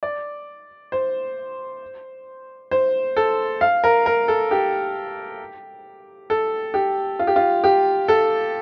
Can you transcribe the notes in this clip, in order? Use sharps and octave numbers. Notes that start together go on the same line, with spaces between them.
D5
C5
C5
A4
F5
A#4
A#4
A4
G4
A4
G4
F4
G4
F4
G4
A4